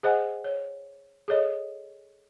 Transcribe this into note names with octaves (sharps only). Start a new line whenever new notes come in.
G#4 C5 D#5 F#5 G#5
C#5
G#4 A4 C#5 D#5